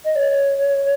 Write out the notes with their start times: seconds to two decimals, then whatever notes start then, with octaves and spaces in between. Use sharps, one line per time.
0.05 D#5
0.16 C#5